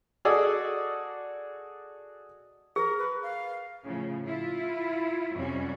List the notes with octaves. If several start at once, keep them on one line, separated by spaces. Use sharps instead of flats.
F#4 G#4 A4 D5 D#5
G#4 A#4
B4
F5
A2 C#3 F3
E4 F4
F2 C3 G3 C#4 F#4